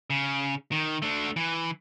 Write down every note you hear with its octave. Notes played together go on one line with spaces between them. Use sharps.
C#3
D#3
A3 D4
E3